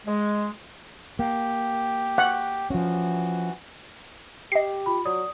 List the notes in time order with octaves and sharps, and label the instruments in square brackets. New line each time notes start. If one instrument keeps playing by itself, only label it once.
[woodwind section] G#3
[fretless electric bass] A#3 [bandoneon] G4
[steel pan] F#5
[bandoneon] E3 F#4 [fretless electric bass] F3 C#4
[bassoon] G4 [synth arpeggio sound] D#5 C7
[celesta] F4 B5
[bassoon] F#3 [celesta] D5 D#6